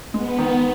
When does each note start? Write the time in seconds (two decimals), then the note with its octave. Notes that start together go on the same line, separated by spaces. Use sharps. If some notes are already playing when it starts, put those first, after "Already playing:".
0.14 G#3 B3
0.39 D#3